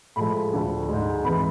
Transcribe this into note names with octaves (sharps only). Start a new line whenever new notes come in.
A2 F3 G#3 B5
D2 D3 F3
G#2 G#3
F2 E3 G#3 B5